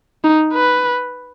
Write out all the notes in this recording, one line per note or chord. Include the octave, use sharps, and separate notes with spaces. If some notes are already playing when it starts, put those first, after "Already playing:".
D#4
B4